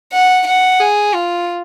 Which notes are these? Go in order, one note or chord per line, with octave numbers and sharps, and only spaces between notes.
F#5
F#5
G#4
F4